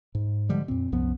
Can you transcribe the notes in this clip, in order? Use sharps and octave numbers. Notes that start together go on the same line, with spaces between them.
G#2
D3 F3 G3 G#3
F2 A#2 C4
C2 F#2 F3 B3